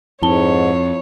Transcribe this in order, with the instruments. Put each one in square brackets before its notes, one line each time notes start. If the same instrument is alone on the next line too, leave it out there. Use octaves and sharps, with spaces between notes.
[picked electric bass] F2 [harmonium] G#2 [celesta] E4 A5 G7 [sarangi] C#5